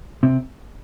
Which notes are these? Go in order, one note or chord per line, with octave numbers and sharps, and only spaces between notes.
C3 C4